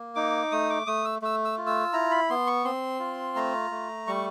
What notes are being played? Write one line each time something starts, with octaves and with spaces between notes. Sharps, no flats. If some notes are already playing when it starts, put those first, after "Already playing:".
Already playing: A#3
D#4 D6
A3 D#6
D6
A3 D#6
E6
A3 E6
E6
F4
E6
E4 A#5
B5
B3 C6
C#6
C4 C6
F4
A3 A#5
A3
G3 C#6